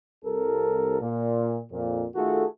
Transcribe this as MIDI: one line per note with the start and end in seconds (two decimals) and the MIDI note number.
0.25 0.99 36
0.25 0.99 69
0.25 0.99 70
1.01 1.61 46
1.71 2.05 41
1.71 2.05 46
2.16 2.45 51
2.16 2.45 57
2.16 2.45 65
2.16 2.45 66
2.16 2.45 68
2.16 2.45 69